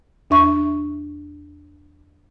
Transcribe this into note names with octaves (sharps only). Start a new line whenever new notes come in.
E2 D4 E5 C#6